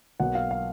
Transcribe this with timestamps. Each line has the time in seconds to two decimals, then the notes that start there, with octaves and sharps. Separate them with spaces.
0.20 B1 B2 F#3 A#3 F#5
0.35 F5
0.51 F5